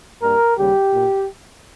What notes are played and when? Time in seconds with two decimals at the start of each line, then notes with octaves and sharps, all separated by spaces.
0.22 G2 G3 A#3 A#4
0.58 D#2 C#3 G3 G4
0.93 A#2